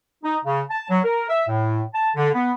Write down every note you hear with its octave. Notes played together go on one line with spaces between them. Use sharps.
D#4
C#3
A5
F#3
A#4
E5
A2
A5
D3
B3